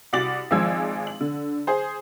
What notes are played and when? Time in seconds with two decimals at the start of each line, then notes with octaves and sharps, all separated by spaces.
0.13 C2 F#4 D6 A6 F#7
0.51 G#1 F3 G#3 E6 G#6
1.07 F#7
1.21 D3
1.67 G#4 C5